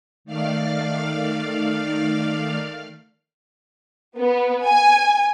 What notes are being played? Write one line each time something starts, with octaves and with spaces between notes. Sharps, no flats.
D#3 A3 D5 F5 F6
B3
G#5